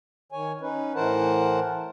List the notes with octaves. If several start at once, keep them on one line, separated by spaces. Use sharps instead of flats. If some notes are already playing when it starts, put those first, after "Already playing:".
D#3 C#5 G#5
C#4 D#4 B4
A2 E3 A#4 C5 F#5 A5